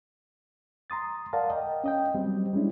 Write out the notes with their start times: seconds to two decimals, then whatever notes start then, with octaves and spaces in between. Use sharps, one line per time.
0.90 A#5 C6 D#6 A6
1.33 A#4 D5 F5 F#5 A5 A#5
1.50 D#5 G5
1.84 C#4 D#5 G5
2.14 F#3 G3 C4
2.53 G3 G#3 C#4 D4 E4